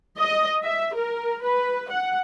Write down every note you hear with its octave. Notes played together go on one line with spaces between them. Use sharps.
D#5
E5
A#4
B4
F#5